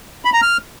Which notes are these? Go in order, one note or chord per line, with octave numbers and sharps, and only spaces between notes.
B5
A#5
F6